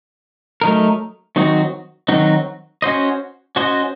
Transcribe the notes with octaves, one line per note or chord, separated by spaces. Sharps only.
F#3 A3 D#4 A#4
D#3 F#3 C4 D#4 F#4
D#3 F#3 C4 D#4 F#4
C#4 F#4 C5 D#5
C#4 F#4 C5 D#5